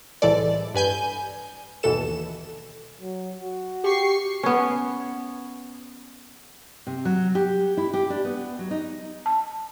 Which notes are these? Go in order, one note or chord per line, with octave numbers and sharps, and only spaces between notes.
C2 A2 E3 G#3 A4 D5
G2 B4 G#5 G6
G1 D#2 B2 E3 A4 E7
F#3
F#4
G4 C#6 C7
B3 C#4
C3
F#3
G4
E4
G4
D4
B3
F#3
D#4
A5